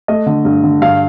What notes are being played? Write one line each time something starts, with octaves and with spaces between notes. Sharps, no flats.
A3 D#5
D3
G2
D3
G2 F5